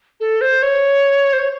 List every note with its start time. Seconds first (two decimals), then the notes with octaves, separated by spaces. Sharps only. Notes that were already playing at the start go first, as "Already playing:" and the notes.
0.20 A4
0.41 C5
0.62 C#5
1.33 C5
1.39 C#5